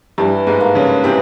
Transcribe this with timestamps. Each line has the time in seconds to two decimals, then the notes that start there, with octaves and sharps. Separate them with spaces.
0.18 G2 E3 G3
0.47 G#2 G#3
0.60 A#3
0.75 C#3 C#4
1.04 C3 E3 C4